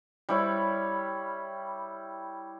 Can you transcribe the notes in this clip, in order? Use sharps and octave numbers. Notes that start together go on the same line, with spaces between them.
G3 E4 C#5